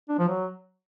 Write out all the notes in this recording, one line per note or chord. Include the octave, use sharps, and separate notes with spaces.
D4
F3
F#3